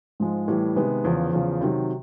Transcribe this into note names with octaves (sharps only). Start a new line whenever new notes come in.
G#2 F3 G#3
A2 E3 G3
C3 D#3 G#3 B3
E2 C#3 F3
E2 C#3 F3
C3 D#3 F#3